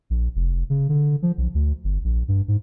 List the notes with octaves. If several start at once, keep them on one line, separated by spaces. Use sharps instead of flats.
A#1
F1
C#3
D3
F3
B1
D2
G1
A#1
G2
G#2